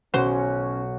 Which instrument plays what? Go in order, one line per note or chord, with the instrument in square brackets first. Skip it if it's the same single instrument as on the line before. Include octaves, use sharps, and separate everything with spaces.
[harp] B1 [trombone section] C#4 [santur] F#4 [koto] C5